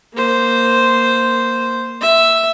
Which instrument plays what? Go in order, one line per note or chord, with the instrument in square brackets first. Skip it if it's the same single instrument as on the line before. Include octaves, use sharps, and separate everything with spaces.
[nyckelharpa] A#3 C5
E5